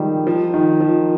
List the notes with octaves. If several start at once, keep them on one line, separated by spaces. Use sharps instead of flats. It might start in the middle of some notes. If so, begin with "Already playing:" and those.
Already playing: D#3 F3 G3 G#3
F3
D#3
F3